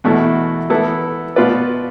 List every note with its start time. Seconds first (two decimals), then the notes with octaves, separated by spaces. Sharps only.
0.04 E2 B2 A3 E4
0.70 E3 B3 E4 A4
1.36 B2 B3 F4 B4 D5